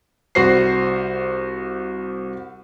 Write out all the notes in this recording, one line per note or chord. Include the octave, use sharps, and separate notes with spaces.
C2 F#4 C5 C7